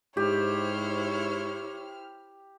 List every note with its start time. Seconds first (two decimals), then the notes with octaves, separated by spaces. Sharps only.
0.17 G#2 E4 G4 C5 C#5 F6